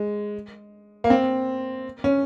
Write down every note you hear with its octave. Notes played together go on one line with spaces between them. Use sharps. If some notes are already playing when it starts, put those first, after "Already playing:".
Already playing: G#3
A#3
C4
C#4